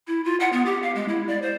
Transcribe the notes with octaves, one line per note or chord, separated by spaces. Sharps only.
E4
F4
F#5
B3
G4
F5
G#3
E4
D5
C5